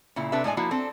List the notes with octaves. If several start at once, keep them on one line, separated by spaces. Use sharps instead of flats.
A#2 C#3 E4
C3 D4 A4 B4 E5
A2 G#3 D5 G#5
F3 A#3 E4 F#4
C4 D4 A4